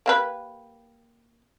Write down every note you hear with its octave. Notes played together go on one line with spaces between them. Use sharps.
A#3 G4 B4